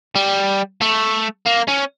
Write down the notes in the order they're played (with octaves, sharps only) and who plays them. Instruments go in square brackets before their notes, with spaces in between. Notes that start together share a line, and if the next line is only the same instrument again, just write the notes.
[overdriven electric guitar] G3
A3
A#3
C#4